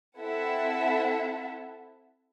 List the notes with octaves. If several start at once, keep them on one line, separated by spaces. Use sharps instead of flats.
C4 E4 A4 E5 F#5 A5